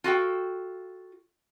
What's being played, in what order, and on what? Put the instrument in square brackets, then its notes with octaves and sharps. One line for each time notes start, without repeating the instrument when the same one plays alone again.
[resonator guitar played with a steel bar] F4 F#4 A4 G5